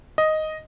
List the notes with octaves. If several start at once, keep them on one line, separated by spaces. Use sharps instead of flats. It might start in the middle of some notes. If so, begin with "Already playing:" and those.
D#5